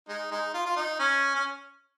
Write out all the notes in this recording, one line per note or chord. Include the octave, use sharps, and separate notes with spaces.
G#3 D#4
G#3 D#4
F4
F4
D#4
C#4
C#4